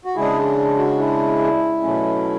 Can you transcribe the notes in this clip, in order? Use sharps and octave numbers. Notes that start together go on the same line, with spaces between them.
F#4
C#3 G#3 D4 E4 G#4
F#4
E4
B2 F#3 A3 C#4